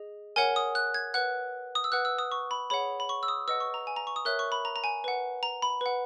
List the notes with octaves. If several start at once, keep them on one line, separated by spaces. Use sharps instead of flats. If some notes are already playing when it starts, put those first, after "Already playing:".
Already playing: G#4 D#5
A#4 C#5 F#5 G#5
D#6
F#6
G#6
B4 F#5 F#6
D#6
E6
B4 F#5 F#6
E6
D#6
C#6
B5
G#4 C#5 F#5 B5
B5
C#6
E6
D#6
B4 D#5 F#5 E6
C#6
A#5
G#5
A#5
C#6
D#6
A#4 C#5 E5 F#6
C#6
B5
A#5
A#5
G#5
B4 F#5
A#5
B5
B4 F#5